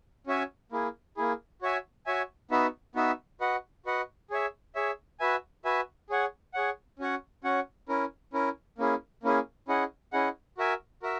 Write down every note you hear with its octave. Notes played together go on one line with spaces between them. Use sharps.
C#4 F#4 C#5 E5 G#5
A#3 E4 G#4
A#3 E4 G#4
F#4 C#5 E5 G#5
F#4 C#5 E5 G#5
B3 D#4 F#4 B4 E5
B3 D#4 F#4 B4 E5
F#4 B4 D#5 F#5
F#4 B4 D#5 F#5
G#4 C#5 E5
G#4 C#5 E5
F#4 B4 E5 G#5
F#4 B4 E5 G#5
G#4 C#5 F#5
G#4 C#5 F#5
C#4 F#4 C#5 F#5
C#4 F#4 C#5 F#5
C#4 E4 A#4
C#4 E4 A#4
A#3 C#4 E4 G#4
A#3 C#4 E4 G#4
C#4 E4 G#4 D#5 F#5
C#4 E4 G#4 D#5 F#5
F#4 A#4 E5 G#5
F#4 A#4 E5